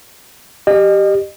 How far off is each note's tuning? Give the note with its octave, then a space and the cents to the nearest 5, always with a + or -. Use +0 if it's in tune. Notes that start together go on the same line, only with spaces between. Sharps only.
G4 +0 D#5 -35